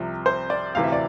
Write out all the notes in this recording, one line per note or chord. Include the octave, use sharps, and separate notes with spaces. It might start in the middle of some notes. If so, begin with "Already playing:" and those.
Already playing: C2 C3 F3
C5
D5
D2 C3 E3 F5
E5
D5